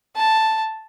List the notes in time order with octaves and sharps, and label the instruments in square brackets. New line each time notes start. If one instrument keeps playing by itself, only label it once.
[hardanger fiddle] A5